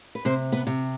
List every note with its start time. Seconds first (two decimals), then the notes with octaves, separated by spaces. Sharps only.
0.15 B4
0.25 C3 C4 C5
0.52 B3 B4
0.67 C3